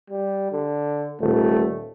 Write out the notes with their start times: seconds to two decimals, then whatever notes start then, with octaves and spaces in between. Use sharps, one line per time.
0.10 G3
0.52 D3
1.20 D#1 A3